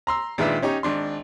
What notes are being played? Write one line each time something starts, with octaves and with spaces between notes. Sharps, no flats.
A#5 C6 E6
A#2 D#3 G#3 D4 B4 E5
C#4 D#4 G4 C#5
G#1 D4 C6